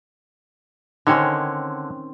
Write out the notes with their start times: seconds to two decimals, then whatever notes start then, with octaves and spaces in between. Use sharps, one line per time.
1.07 D3 D#3 C4 C#4 C#5